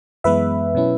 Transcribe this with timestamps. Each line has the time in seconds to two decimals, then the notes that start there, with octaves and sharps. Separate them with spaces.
0.24 F#2 E3 G#3 B3 B4 E5
0.75 B2 F#3 C#4 E4